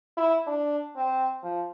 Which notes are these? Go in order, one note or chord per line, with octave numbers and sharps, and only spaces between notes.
E4
D4
C4
F3